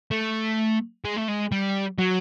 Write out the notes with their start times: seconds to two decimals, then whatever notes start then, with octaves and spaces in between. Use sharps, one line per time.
0.11 A3
1.05 G#3
1.17 A3
1.28 G#3
1.52 G3
1.98 F#3